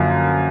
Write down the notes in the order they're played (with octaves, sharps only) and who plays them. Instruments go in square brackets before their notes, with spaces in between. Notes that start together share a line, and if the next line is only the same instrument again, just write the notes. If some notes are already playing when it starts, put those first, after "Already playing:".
Already playing: [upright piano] F#2 D3 F3 A#3